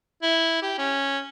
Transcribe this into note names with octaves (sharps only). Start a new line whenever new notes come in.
E4
G4
C#4